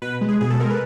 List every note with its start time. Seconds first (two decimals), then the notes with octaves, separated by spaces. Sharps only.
0.02 B2 B4
0.21 G#3
0.29 G#4
0.41 B2 G#4
0.50 A4
0.60 G#3 A#4
0.70 B4